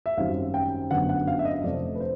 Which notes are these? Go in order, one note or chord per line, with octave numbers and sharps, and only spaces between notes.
E5
G#1 F#2 D#3 G3 C4 F5
G5
G1 F#2 D3 F#3 B3 F#5
F#5
F5
E5
D#5
F1 F2 D3 F3 A3 D5
B4
C5